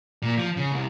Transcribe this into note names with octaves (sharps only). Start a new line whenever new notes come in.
A#2
F3
C#3
C2